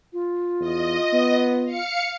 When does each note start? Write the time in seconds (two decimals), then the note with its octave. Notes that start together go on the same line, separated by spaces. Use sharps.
0.13 F4
0.60 E2 D#5
1.13 B3
1.65 F5 C#7